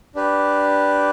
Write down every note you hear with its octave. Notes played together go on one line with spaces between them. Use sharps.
D4 G4 B4